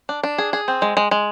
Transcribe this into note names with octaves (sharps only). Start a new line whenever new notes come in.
D4
D4
G#4
G#4
C4
G#3
G#3
G#3